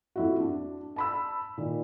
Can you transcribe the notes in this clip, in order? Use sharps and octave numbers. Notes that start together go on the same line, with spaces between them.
F2 E4 F#4
D4
A5 B5 E6
A#2 D#3